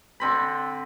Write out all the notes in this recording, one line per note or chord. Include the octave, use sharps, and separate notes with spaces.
D3 C4 B5